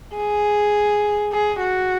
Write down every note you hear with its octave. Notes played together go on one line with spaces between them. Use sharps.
G#4
G#4
F#4